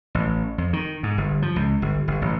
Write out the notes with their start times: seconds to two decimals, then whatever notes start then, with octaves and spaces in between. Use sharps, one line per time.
0.15 A1
0.58 F2
0.73 D#3
1.03 G#2
1.18 G1
1.42 F3
1.56 C#2
1.82 G1
2.08 G1
2.22 A1